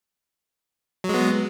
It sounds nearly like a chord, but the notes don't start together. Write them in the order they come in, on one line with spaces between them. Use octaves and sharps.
F#3 G#3 B3